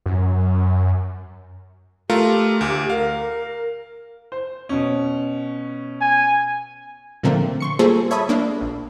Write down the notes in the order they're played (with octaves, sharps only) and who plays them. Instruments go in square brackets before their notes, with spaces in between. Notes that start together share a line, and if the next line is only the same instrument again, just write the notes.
[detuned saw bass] F#2
[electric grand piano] A3 F4 A#4 [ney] G4
[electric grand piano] D2
[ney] A#4 [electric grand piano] F5
[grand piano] C5
B2 C#4
[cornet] G#5
[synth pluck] A#2 D3 F3 A3 A#3 C4
C6 C#6 C#7
G3 A#3 F4 G#4 A4 C5
C#5 E5 A5 B5 D#6
A#3 D4
A#1